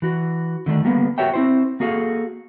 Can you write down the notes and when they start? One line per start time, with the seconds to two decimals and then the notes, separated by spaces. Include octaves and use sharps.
0.02 E3 F#4
0.66 D3 D#3 A3 D4
0.84 D3 G3 A#3 B3
1.18 F#4 G4 A#4 C#5 E5 G5
1.34 C4 E4 C5
1.80 A#3 F#4 G#4 A4 F5